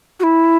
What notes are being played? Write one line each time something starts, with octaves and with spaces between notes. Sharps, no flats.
F#4
E4